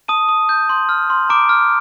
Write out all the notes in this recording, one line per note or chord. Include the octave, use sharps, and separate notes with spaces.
A5 D#6 D#7
D#6
G6
C6
F6
C6
A#5 D6 D7
F6